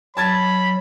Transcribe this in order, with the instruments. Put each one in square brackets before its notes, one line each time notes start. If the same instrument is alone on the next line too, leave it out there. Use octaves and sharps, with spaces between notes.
[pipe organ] F#3 [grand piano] A5 G#6 A6 [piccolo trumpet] B5